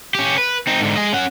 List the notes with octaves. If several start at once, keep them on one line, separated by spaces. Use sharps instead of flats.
C#4 G4
B4
C4 D#4
G#2 D3
G#3 D#5
C#4 F#5